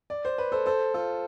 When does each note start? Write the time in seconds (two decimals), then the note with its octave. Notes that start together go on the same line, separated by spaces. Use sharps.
0.10 D5
0.25 C5
0.38 B4
0.52 A4 C5
0.66 A4 C5
0.94 F4 A4